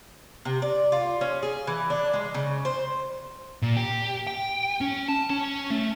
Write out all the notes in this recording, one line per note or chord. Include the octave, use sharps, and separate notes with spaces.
C3
D5
F4
C#4
G#4
E3
D4
G#3
C#3
C5
A#2
G4
G5
C#4
A5
C#4
A3